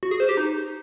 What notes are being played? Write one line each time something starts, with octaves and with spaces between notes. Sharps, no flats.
F#4
G#4
C5
G4
D#4